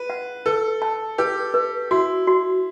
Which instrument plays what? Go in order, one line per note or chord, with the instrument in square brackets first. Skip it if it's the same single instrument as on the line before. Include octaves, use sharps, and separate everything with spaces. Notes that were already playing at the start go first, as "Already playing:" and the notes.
Already playing: [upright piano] B4
[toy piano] F#5
[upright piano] A4 [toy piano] B4
[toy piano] A5
[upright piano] G4 [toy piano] B4
[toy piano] B4
[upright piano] E4 [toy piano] F#4
[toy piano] F#4